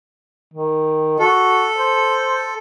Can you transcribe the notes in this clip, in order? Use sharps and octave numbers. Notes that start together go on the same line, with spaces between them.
D#3
F#4 A4
C5